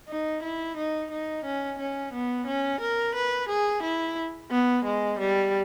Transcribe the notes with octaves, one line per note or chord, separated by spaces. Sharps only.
D#4
E4
D#4
D#4
C#4
C#4
B3
C#4
A#4
B4
G#4
E4
B3
G#3
G3